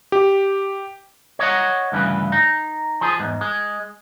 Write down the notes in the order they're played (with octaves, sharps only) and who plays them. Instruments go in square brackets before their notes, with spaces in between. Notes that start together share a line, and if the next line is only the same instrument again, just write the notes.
[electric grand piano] G4
[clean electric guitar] C#5 D#5 F#5
D2 G2 C#3 E3 B4
D#4
F3 G#4
E2 G#2
G#3